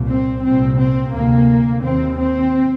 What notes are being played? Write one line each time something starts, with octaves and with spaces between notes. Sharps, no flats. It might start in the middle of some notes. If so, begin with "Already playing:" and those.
Already playing: C2 A#2
C4
C2 A#2 C4
C4
D2 C3 A#3
D#2 C4
C4